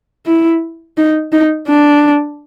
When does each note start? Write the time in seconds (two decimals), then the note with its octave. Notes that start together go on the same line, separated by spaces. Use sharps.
0.27 E4
0.98 D#4
1.32 D#4
1.68 D4